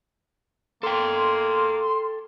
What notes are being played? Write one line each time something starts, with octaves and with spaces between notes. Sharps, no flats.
A#3 A4 G5 C6